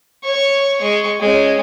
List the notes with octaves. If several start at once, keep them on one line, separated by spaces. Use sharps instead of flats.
C#5 C#6
G#3 C#6
G#3 C#4